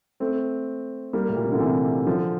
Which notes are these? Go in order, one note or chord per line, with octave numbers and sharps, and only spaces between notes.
A3 C4
G3 A#3
A2
A#2
C3
D3
C3 E3
D3 F3